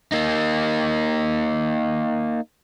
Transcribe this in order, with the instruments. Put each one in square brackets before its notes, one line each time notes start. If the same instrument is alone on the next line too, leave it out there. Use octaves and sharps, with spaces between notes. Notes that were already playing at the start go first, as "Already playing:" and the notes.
[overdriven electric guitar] A#3 D#4